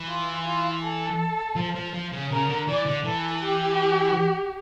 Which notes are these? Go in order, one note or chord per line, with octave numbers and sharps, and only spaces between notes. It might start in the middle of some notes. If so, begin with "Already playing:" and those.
Already playing: E3
F4
F4
A4
F3
F3
F3
C#3
C#3 A#4
D3
E3 D5
D3
E3 A4
G4